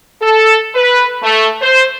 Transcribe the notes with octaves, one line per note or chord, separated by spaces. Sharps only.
A4
B4
A3
C5